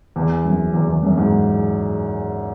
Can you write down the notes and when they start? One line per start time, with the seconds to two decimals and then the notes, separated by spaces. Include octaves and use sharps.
0.16 E2
0.45 F#2
0.74 E2
0.88 E2
1.03 F#2
1.17 G#2